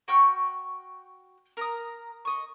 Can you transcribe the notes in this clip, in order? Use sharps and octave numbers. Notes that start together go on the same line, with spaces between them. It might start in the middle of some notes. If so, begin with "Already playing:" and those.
F#4 G5 C#6 F6
A#4 A#5 D#6
D#5 C#6